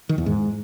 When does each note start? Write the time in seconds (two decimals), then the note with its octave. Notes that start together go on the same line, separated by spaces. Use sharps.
0.09 D#3
0.18 E2
0.26 G#2